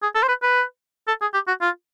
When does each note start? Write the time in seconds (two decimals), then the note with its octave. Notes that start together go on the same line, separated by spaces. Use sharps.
0.02 G#4
0.15 A4
0.23 C5
0.28 B4
0.42 B4
1.07 A4
1.21 G#4
1.34 G4
1.47 F#4
1.61 F4